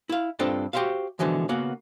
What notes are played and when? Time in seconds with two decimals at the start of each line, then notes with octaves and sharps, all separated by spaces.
0.09 E4 F5
0.39 G2 C4 D4 F4 A4 D#5
0.73 F#4 G4 A4 C5 E5 F5
1.19 B2 D3 E3 F3 G#3
1.49 C#3 A#3 B3 F#4 F5